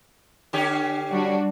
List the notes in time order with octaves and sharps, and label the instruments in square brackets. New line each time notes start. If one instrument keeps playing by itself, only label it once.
[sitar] D3 C#4 G4
[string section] G3 D4 F#4